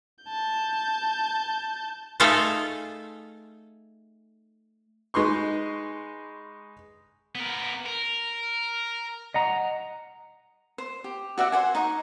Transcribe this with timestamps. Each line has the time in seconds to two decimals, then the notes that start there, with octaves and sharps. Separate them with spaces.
0.25 A5 G6
2.20 A3 D#4 F4 G#4 A4 F5
5.14 G#3 D#4 B4 C6 C#6
7.35 B3 A#4
7.86 A#4
9.34 D#5 F#5 A#5
10.78 C5
11.04 G4
11.38 F#4 D5 E5 F#5
11.52 C5 F#5 G#5
11.75 D#4 D#5 C#6